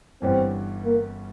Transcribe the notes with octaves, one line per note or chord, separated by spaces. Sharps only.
G1 G2 E3 G3 C4 C#4
A#3